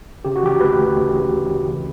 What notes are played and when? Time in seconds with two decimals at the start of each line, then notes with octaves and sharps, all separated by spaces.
0.25 C#3 G4
0.36 F#4
0.43 E3 G4
0.61 D2 B4
0.78 D2
0.96 C#3
1.14 E3
1.32 D2
1.49 D2
1.67 C#3